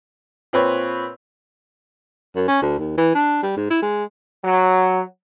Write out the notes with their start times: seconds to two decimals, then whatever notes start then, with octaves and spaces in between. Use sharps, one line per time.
0.53 A#2 C4 B4 C#5
2.36 F#2
2.48 C#4
2.62 D2
2.79 D#2
2.98 E3
3.15 D4
3.43 G3
3.57 G#2
3.70 E4
3.82 G#3
4.44 F#3